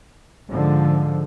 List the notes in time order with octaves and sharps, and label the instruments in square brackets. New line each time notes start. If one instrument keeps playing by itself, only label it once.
[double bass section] G#2 D3 F3 G#3